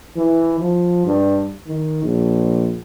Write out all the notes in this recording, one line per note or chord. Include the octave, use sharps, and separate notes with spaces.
E3
F3
G2
D#3
A#1